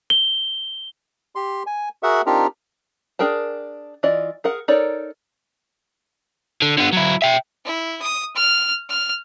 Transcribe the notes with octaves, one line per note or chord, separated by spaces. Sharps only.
G7
G4 C6
G#5
F#4 G#4 A#4 E5 F#5
C4 D4 D#4 F4 G4 A#4
D4 G#4 A#4 G5 A5
E3 F4 D5 D#5
G#4 A#4 F#5
D#4 A4 A#4 C#5 D5
D3
D3 B3
F#3 E4
E5 G5
E4
D#6
F6
F6